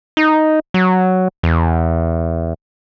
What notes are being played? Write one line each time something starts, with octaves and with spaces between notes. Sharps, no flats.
D#4
F#3
E2